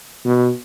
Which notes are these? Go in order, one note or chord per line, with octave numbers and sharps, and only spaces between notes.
B2